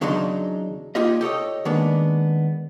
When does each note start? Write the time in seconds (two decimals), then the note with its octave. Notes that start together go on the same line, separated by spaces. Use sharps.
0.01 E2 C#3 F#3 D4 D#4 C6
0.95 A#3 D#4 F4 G4 D#5
1.21 G4 A4 C#5 D#5
1.65 D#3 G#3 A#3 B3 D4